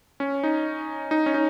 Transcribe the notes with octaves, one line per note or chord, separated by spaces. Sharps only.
C#4
D#4
D#4
C#4
D#4